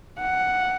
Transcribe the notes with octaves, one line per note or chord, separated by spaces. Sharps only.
F#5